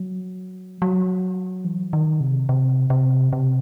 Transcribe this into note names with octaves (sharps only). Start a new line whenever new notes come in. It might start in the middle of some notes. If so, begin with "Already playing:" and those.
Already playing: F#3
F#3
E3
D#3
C3
C3
C3
C3